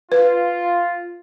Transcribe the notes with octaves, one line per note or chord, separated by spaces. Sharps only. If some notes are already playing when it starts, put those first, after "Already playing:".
F4 B4